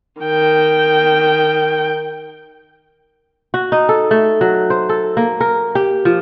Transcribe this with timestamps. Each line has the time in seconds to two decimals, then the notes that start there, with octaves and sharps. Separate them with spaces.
0.21 D#3 G5
3.54 F#4
3.72 D#4
3.89 A4
4.11 A3
4.41 F#3
4.70 C5
4.89 A4
5.17 A#3
5.41 A#4
5.75 G4
6.05 F3